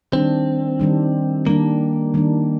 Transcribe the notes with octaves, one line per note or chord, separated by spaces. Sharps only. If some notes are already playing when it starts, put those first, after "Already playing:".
D#3 G3 C4 D4
D#3 G3 D4
D#3 G3 A#3 D4
D#3 G3 D4